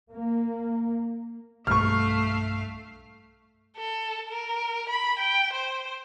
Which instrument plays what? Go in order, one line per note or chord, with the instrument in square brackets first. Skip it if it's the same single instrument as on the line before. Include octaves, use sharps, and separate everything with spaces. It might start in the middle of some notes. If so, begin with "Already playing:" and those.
[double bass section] A#3
[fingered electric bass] B1 G2 [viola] A3 F5 [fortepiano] C#6 F6
[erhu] A4
A#4
B5
G5
C5